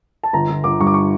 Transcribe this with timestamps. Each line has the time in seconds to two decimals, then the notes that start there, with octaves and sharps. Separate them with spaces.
0.23 A5
0.33 G1 A#5
0.49 G1
0.64 G1 D6
0.80 G2 C#6
0.87 D6
0.94 C#6